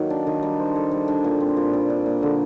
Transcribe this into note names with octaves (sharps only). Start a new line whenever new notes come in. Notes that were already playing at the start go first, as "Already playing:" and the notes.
Already playing: D#3 F#3 A#3
D4
D#3
G3
C5
A4
G3
D4
A#2
C4
A#2
G3
D4
A#3
D3